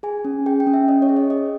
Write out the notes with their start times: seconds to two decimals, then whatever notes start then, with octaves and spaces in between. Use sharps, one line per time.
0.03 G#4 G#5
0.25 C#4
0.46 G#4 G5
0.60 G5
0.67 C#4
0.74 E5
0.88 C#4 D#5
1.02 C#5
1.09 G#4
1.16 D#5
1.30 G#4 D#5